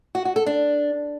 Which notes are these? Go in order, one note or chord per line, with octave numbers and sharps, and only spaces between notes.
F#4
F#4
A4
D4